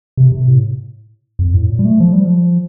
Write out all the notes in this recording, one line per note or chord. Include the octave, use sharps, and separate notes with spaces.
C3
C3
A2
F2
A2
A#2
G3
A3
F3
G3
F3